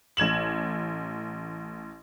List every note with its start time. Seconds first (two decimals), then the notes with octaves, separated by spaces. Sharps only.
0.17 A1 G#6 E7 F#7